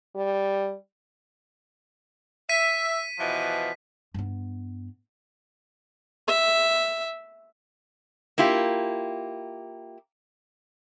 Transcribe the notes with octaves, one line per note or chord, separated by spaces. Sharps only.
G3
E5 B6 D#7
B2 E3 F3
G2 B3
E5
A#3 E4 F4 G4